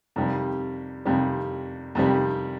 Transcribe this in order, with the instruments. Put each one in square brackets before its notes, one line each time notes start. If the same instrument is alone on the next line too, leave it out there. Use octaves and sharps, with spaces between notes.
[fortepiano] F2 C3 D#3 G3
F2 C3 D#3 G3
F2 C3 D#3 G3